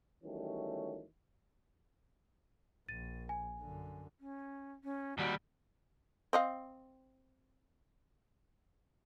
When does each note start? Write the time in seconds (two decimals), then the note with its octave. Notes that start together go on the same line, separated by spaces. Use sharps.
0.24 D#3 E3 F#3 G3 A3 C#4
2.89 A#1 A6 D#7
3.29 G#5
3.60 F#2 D3
4.20 C#4
4.84 C#4
5.18 D#2 G3 F#4
6.33 C4 D#5 F5